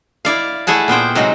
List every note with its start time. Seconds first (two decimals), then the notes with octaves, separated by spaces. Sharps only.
0.25 E4 D5 F5
0.67 A3 E4 G#4 F#5 A5
0.88 A#2 B3 C5 G5
1.15 C3 F#3 G#3 C4 D#4